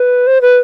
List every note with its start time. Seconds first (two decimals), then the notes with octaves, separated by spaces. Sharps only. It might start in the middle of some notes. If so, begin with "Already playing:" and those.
Already playing: B4
0.27 C5
0.41 B4